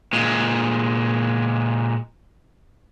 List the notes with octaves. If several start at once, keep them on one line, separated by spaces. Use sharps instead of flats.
A#2 G#3